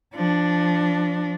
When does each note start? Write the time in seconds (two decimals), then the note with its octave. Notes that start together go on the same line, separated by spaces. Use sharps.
0.15 F3 D4